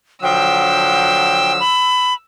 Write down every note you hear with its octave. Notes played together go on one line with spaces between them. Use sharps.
D3 F3 F#3 G5 E6
B5